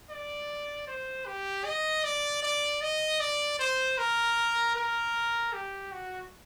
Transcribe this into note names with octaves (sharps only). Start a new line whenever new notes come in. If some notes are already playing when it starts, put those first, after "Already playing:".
D5
C5
G4
D#5
D5
D5
D#5
D5
C5
A#4
A#4
G4
F#4